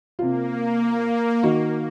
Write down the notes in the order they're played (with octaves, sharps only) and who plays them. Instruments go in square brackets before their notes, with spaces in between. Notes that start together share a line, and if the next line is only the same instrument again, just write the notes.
[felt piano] C3 F4 [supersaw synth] A#3
[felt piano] D#3 F#4